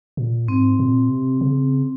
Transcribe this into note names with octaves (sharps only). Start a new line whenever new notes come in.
A#2
G#2 C4
A#2
C3
C#3